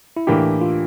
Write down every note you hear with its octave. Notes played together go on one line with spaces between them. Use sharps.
E4
A2 E3 A#3 D4 E4 G4
F4